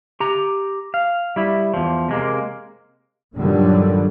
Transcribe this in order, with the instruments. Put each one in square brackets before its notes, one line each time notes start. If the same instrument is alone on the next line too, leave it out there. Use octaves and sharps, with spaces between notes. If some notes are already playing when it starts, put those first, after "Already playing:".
[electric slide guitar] G4 A#5
F5
G3 E4
E2 F3
C3 G#3 A#3
[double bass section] G2 A#2 D3 D#3 F#3 G3